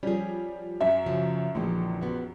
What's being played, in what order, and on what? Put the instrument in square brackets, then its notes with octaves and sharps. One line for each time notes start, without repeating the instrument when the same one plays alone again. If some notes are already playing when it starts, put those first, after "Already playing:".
[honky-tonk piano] F3 G3 [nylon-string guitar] C#4 G#4
[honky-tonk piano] F#2 [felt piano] E5
[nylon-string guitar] C#3 F3 F#3
[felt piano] A#1 [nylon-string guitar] D3 E3 G#3
[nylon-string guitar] B3 F#4